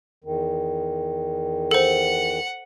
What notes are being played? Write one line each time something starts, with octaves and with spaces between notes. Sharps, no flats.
E2 D#3
A4 C5 F#5